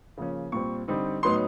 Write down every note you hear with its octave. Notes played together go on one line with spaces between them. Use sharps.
C#3 F3 A#3 C#4
A#2 G3 C4 C#6
D3 G3 C4 D#4
A2 F#3 B3 D#4 C6